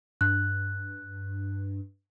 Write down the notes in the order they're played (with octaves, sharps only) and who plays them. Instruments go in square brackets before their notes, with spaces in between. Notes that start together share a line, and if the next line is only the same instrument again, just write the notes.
[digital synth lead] G2 [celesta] F#6